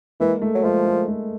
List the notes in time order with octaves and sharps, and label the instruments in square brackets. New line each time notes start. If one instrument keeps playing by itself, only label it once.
[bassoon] E3 [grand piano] G#3 A#3
[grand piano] A3
[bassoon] F#3
[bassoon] F3 [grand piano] G#3
[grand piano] A3
A3